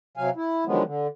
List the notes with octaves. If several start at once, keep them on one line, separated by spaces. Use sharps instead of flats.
C3 F#3 F5 G#5
E4
D3 D#3 F3 F#3 G#3 B3
D3